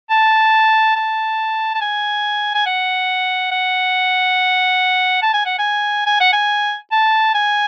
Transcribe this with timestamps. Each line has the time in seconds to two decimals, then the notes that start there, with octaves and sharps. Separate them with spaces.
0.11 A5
0.96 A5
1.75 A5
1.81 G#5
2.55 G#5
2.66 F#5
3.51 F#5
5.22 A5
5.34 G#5
5.46 F#5
5.58 G#5
6.06 G#5
6.20 F#5
6.33 G#5
6.92 A5
7.35 G#5